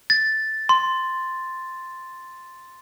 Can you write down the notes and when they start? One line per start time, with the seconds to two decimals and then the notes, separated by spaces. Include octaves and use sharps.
0.10 A6
0.69 C6